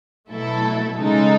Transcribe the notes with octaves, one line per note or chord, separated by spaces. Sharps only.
B2 F#3 A3 E4 A4
C#3 G#3 D#4 A4